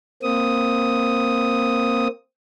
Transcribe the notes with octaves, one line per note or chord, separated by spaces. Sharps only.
A#3 C4 D#6